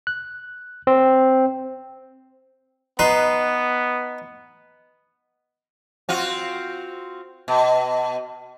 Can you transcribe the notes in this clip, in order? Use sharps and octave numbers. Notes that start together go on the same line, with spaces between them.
F#6
C4
B3 D#4 B4 C6
C4 F4 F#4
B2